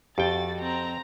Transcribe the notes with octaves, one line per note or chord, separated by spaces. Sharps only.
F2 F#4 G4 G5 A6
C4 A#5